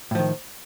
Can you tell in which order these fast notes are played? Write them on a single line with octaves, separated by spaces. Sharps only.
A2 F3 D#3